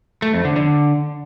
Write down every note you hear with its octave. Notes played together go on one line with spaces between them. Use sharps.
A3
F2
D3
D3